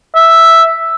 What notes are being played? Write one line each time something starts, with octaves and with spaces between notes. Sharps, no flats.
E5